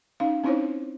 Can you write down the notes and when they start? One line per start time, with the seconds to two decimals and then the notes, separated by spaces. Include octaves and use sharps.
0.20 C#4 D#4 F5
0.44 C4 C#4 D#4 E4 C5 C#5